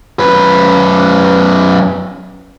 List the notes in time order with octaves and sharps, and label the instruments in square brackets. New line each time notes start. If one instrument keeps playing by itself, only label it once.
[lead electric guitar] F#2 B4